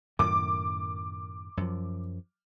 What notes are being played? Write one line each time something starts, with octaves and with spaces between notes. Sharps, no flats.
F#2 A2 D#3 D6
F#2 F3